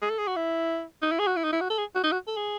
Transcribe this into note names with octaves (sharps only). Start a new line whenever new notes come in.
G#4
A4
G#4
F#4
E4
D#4
E4
G#4
F#4
E4
D#4
E4
F#4
A4
G#4
F#4
D#4
F#4
A4
G#4